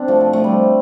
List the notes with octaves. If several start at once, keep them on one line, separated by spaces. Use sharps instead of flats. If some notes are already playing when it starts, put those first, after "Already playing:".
Already playing: C4 D4
F3 A3
F3
F3 A3
G3